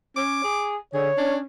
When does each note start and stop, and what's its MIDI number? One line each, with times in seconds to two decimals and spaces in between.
0.16 0.42 61
0.16 0.72 86
0.44 0.76 68
0.94 1.11 50
0.94 1.09 68
0.94 1.35 73
1.18 1.42 61
1.18 1.38 62